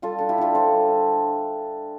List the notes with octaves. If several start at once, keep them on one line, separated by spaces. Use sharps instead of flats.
G3 F4 A4
D4 A4
E4 G4
D3 F4 A4
D3 A4 C5
G3
D4